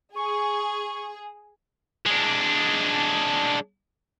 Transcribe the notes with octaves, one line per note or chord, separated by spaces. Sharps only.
G#4 C#6
G#3 D4